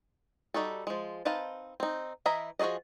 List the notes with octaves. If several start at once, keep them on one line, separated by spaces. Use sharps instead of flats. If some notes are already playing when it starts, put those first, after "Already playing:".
G3 D#4 F#4 A4
F3 G#3
C4 D#4 B4 F5 A5
C4 D#4
E3 E4 D#5 A#5 B5
F3 F#4 G#4 D5 D#5